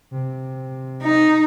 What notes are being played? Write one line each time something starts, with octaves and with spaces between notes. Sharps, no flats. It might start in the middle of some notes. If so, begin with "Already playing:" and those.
C3
D#4